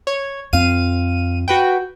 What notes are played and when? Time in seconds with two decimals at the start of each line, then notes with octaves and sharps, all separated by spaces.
0.07 C#5
0.53 F2 C4 F5 D#7
1.48 F#4 B4 G5